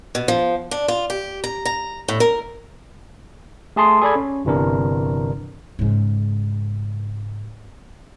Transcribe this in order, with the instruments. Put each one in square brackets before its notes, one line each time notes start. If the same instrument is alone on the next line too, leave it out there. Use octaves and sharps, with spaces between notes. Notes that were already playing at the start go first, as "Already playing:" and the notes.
[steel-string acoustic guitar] B2
F3
D4
F4
G4
A#5
A#5
A2
A#4
[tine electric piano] A3 G#4 A5 C6 D#6
G#4 A4 D5 B5 G#6
C#4
G1 C3 E3 D4 A#4
[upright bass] G#2 C#3